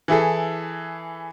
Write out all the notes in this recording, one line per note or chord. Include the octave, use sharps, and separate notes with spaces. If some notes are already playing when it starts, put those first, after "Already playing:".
E3 E4 G#4 A4